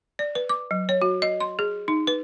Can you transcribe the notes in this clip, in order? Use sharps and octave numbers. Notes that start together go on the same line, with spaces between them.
D5
B4
D6
F#3
C#5
F#4
D#5
C6
G#4
D#4
B4